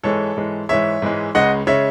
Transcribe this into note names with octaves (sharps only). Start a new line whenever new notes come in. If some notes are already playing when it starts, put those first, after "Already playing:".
G#2 E3 G#3 A4 C#5
G#2 E3 G#3
G#2 E3 G#3 C#5 E5
G#2 E3 G#3
C#2 C#3 G#3 D#5 F#5
C#3 G#3 C#5 E5